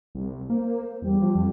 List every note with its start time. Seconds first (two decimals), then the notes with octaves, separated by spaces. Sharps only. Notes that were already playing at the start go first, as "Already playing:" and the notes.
0.15 C2
0.50 A#3 C5
1.02 E2 G3
1.22 F3
1.35 F2